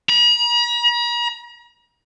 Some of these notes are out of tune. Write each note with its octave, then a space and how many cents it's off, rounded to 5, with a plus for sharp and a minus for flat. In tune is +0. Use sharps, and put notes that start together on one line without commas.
A#5 +45